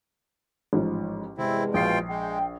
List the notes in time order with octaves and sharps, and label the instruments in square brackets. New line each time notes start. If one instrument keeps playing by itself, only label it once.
[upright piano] A1 G#2 F3
[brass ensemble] E2 G2 G#3 [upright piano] C3 [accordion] C4 E4
[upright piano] A#1 C7 [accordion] B2 F4 G5
[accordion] G#3 [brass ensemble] G5